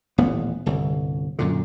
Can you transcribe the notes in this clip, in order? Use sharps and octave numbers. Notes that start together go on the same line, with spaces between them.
D#1 A1 B3
G1 C2
F#2 A#2 D3